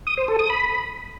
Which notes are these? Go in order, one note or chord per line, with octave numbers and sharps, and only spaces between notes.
D#6
C5
A4
D#6
B5